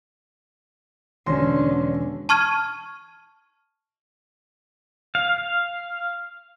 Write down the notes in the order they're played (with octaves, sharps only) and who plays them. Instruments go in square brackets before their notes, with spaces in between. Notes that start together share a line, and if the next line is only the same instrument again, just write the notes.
[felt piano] E1 A#6 [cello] D3 [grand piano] C#4 C6
[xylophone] A5 C#6 F6 G#6 D#7
[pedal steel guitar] F5